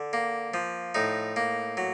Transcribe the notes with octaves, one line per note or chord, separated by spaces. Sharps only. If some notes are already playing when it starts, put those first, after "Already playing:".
Already playing: D3
A#3
F3
A2 D#4
A#3
F#3